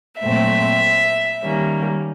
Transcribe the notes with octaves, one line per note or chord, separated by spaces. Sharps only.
A#2 F#3 A3 C4 E5
D#3 G3 A#3 C#4